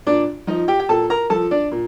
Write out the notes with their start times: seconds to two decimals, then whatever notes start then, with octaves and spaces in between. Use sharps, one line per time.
0.07 A#2 D4 D5
0.47 F3 D#4 D#5
0.68 G4 G5
0.80 G5
0.89 A#2 A4 A5
1.10 A#4 A#5
1.30 F3 A4 A5
1.51 D4 D5
1.72 A#2